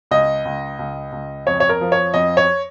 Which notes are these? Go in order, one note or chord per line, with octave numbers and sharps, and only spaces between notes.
C#2 D#5
C#2
C#2
C#2
F2 C#5
C#5
A#4
F3
C#5
F2 D#5
C#5